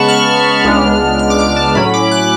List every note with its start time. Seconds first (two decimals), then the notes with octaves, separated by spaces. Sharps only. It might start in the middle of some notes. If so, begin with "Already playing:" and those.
Already playing: C#3 G#3 B3 A5 B5 C#6
0.08 F6
0.65 C#2 C#3 G#3 B3 D4
1.19 F6
1.30 D6
1.39 F6
1.57 A5
1.75 A2 F#3 C#4 B5
1.94 D6
2.11 F#6